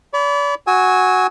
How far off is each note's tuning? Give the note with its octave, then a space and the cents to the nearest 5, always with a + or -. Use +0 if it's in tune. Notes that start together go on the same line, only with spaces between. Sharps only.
D5 -40 B5 +10
F#4 +0 G#5 +0 E6 -40